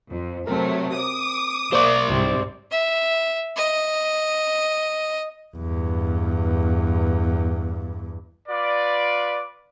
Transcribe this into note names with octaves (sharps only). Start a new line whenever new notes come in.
F2
C3 F#3 A3 C4 A#4
D6 D#6
A#3 C5 D5
C2 G#2 C3 C4
E5
D#5
E2 G2
F4 B4 D5